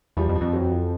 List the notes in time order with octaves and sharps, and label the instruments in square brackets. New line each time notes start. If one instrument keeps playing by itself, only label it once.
[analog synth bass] E2 [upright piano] F3 G3
[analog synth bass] F2
[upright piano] F3
[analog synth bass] F2
[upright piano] E3 F#3
F3